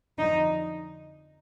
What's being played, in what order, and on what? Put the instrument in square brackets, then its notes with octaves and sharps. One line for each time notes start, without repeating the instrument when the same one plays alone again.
[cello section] F2 D3 F3 D#4